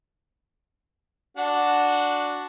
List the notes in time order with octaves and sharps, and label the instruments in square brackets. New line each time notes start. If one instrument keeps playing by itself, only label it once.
[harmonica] D4 F#4 F#5